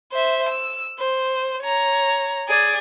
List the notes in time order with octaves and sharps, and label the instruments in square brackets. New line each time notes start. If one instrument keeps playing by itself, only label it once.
[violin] C5 E5
E6
C5
C#5 A#5
G#4 D5